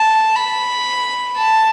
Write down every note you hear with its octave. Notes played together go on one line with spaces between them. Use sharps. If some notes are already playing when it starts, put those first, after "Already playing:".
Already playing: A5
B5
A5